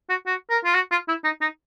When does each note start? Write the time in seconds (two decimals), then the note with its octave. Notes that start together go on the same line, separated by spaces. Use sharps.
0.10 F#4
0.27 F#4
0.50 A#4
0.65 F4
0.75 F#4
0.91 F4
1.08 E4
1.25 D#4
1.42 D#4